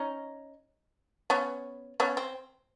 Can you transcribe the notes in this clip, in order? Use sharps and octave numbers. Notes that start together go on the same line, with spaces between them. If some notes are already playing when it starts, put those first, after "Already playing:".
Already playing: C#4 D#4
B3 C#4
B3 C#4
C4